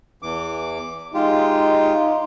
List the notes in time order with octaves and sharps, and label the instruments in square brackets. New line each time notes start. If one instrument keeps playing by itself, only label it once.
[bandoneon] E2 E3 D6
[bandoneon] G#3 F4 G4 [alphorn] D#4